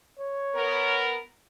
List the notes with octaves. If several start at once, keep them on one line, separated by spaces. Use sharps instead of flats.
C#5
B3 A#4